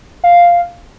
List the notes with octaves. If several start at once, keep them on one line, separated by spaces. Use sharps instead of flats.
F5